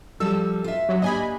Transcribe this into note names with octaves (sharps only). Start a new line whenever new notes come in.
F3 G3 A4 E6
F4 E5
F#3
A#3 D4 G4 D#5 G#5 B5